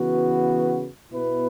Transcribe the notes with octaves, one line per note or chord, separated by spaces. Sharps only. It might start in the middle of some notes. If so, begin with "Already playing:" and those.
Already playing: C#3 E3 B3 F#4 B4
B2 B3 E4 B4